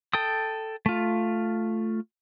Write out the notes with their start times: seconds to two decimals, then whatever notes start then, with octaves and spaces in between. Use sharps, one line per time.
0.13 A4 G5 D#6
0.86 A3 F4